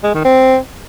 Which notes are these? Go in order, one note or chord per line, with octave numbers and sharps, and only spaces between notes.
G#3
D#3
C4